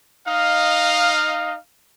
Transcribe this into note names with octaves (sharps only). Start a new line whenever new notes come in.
D#4 D#5 F5